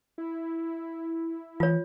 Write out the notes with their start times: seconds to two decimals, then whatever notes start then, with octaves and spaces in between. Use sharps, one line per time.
0.18 E4
1.60 E3 F4 C#5